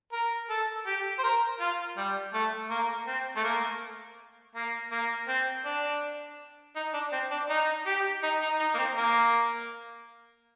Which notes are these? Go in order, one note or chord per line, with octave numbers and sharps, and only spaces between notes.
A#4
A4
G4
C5
A#4
F4
G3
A3
A#3
C4
A3
A#3
A#3
A#3
C4
D4
D#4
D4
C4
D4
D#4
G4
D#4
D#4
D#4
A#3
C4
A#3